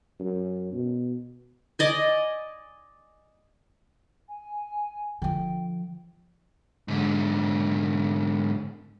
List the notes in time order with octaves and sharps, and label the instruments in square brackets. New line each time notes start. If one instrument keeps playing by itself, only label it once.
[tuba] F#2
B2
[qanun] D5 D#5 G#5
[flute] G#5
[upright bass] D3 F3 [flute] G5
[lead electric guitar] G#2 D3